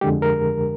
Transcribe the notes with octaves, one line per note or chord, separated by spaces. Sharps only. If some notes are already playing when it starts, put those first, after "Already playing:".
F2 D3 G#3 G4
A#4